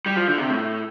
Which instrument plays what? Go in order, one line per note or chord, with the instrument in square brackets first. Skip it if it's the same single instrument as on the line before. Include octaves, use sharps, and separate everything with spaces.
[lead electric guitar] G3
F3
D3
C3
A2